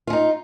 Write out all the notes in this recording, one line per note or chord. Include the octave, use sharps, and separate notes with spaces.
C#4 D#4 F4